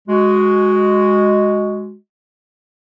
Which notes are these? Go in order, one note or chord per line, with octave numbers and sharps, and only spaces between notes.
G#3 F#4